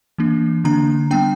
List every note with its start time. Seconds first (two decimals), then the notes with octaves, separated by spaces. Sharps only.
0.18 E3 A#3 D4
0.64 D3 A#3 D4 A#5
1.11 G3 B3 D4 G5